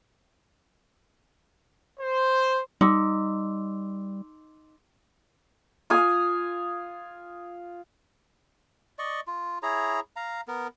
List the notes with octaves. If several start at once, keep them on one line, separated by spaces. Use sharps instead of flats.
C5
G3 D#4 C6 D6 E6
F4 G#5 D#6
D5 D#5 C#6
F4
E4 G#4 C#5 A#5
F5 A#5
B3 A#4